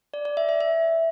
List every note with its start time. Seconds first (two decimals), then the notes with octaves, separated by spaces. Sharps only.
0.14 D5
0.25 D5
0.37 E5
0.49 E5
0.60 E5